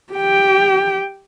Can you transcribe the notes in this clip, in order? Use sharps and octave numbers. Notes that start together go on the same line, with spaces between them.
G4 G5